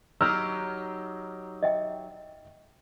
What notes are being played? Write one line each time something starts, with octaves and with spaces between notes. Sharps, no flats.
F#3 D#4 G4 E6 F6
D#5 E5 G5